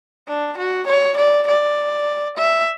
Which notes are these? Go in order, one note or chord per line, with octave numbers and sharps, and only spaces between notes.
D4
F#4
C#5
D5
D5
E5